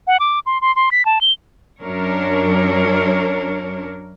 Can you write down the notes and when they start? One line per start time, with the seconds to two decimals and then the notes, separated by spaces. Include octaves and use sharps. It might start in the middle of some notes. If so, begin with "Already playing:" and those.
0.07 F#5
0.20 D6
0.46 C6
0.61 C6
0.76 C6
0.91 B6
1.05 A5
1.21 G7
1.81 F#2 D4 A#4 C#5